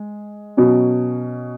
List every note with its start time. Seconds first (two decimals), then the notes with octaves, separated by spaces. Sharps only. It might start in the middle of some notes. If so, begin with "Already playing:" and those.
Already playing: G#3
0.57 B2 F#3 C#4